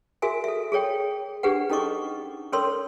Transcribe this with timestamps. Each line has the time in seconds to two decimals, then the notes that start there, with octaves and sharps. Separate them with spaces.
0.22 F#4 G#4 A#4 E5 G#5
0.44 A4 E5
0.72 G#4 A4 C#5 G5
1.43 D4 G4 G#4 B4 F#5
1.70 C#4 D#4 A4 D#5 C#6 D6
2.53 C#4 A4 A#4 C#5 C6 E6